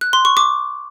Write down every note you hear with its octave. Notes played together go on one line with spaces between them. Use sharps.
F#6
C6
C#6
D6